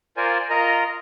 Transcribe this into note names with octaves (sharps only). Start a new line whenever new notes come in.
F4 A#4 C5 D5 G#5
F4 A#4 D#5 A#5